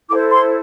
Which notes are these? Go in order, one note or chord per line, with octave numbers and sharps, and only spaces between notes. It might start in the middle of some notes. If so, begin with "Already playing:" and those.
E4 A4 C5 D6
C6